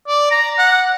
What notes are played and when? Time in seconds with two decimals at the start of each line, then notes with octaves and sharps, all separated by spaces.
0.07 D5
0.31 A#5
0.58 F#5